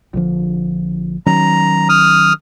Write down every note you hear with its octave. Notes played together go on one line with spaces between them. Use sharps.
A#1 D3 F3
D#3 F#3 C#4 A#5
D#6 F6